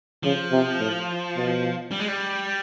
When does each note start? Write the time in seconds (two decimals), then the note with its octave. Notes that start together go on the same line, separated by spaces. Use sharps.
0.23 C#3 F3
0.51 C3
0.79 A2
1.36 B2
1.91 G3
2.00 G#3
2.08 G3